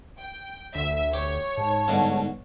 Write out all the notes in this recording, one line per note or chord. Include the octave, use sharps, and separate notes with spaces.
G5
D2 E5
G4 C#5
G#2 A5
G2 B2 D3